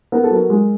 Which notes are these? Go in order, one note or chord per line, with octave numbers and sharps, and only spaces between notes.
B3 A#4
A4
F#3 A#4
G#3